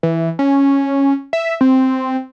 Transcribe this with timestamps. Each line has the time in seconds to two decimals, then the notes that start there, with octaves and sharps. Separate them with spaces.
0.03 E3
0.39 C#4
1.33 E5
1.61 C4